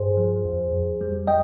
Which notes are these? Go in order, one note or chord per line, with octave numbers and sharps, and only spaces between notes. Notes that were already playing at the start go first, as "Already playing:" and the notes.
Already playing: G2 G#4 C5
F3
F2
F2
G3
G3 D#5 G5